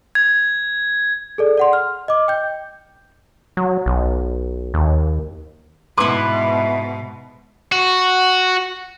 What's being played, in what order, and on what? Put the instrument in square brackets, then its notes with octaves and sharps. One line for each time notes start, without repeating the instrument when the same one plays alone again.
[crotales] G#6
[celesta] G#4 A4 D5
D5 F#5 C6
F6
D#5 D6
G5 G6
[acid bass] F#3
B1
D#2
[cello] G#2 B2 [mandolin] E4 B4 [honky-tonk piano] C6 D6
[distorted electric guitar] F#4